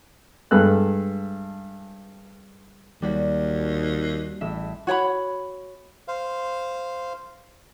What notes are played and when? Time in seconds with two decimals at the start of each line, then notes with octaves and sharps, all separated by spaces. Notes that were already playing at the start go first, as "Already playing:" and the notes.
0.51 G2 G#3 A4 F#6
3.02 D#2 G3 F#4 B6
4.41 A1 E5
4.87 F#4 C#5 G5 B5
6.08 C5 F5